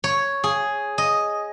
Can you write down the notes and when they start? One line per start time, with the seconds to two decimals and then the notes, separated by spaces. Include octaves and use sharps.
0.04 C#5
0.44 G#4
0.98 D#5